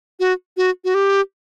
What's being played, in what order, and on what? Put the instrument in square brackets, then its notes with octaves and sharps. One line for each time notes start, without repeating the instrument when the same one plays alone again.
[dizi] F#4
F#4
F#4
G4